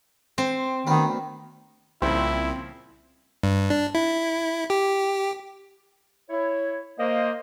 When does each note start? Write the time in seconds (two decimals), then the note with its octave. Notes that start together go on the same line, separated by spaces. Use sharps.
0.38 C4 C5
0.87 D2 D#3 B3
2.02 C2 A#2 C#3 F3 C4 E4
3.43 G2
3.70 D4
3.95 E4
4.70 G4
6.30 E4 C#5
6.99 A#3 C5 D#5